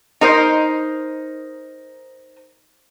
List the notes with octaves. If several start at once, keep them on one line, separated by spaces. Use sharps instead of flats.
D#4 A#4 C5